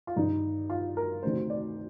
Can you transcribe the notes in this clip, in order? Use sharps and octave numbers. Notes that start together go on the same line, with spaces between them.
F4
G2 D#3 D#4
F4
A#4
D2 C3 D#3 C5
D5